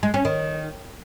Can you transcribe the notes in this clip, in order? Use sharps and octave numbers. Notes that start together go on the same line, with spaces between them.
G#3
C#4
D#3